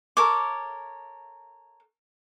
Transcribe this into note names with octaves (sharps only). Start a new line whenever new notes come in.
A4 A#4 C#5 D6